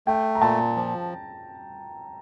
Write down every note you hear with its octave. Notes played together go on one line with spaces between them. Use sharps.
A3 G5
A#5
A#2 A5
F3